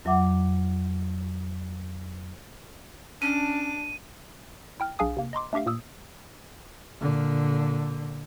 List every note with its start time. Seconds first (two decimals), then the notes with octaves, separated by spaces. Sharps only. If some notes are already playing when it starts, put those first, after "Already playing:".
0.05 F2 F#3 E5 F#5 D6
3.22 C#4 D4 A5 D#7
4.80 E4 G5 F6
4.99 B1 D4 G#4 F5 G#5 D#6
5.17 C3 A#3
5.33 D#5 A#5 C6 D6
5.53 A3 D4 G4 E5 F5
5.66 A#2 A#3 D#6 E6
7.01 A#2 D3